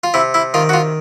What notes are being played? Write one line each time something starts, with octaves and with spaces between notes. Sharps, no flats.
F4
C3 E4
E4
D#3 F4
F#4
F4